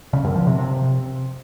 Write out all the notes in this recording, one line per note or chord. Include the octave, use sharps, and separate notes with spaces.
C#3
F#2
F3
C3
C3